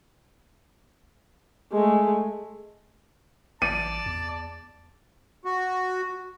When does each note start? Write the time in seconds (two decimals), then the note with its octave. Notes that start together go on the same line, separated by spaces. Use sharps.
1.72 G#3 A3
3.62 A1 D5 A5 D#7
4.06 E2
5.45 F#4